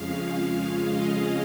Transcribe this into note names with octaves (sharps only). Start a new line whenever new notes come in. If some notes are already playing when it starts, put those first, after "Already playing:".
Already playing: F2 C#3 F3 G#3 C#4 F5
D#5